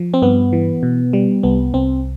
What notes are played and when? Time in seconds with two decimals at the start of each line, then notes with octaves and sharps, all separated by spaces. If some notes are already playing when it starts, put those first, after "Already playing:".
Already playing: F3
0.14 C4
0.22 G2 B3
0.53 E3
0.83 B2
1.13 G3
1.43 C2 B3
1.74 C2 C4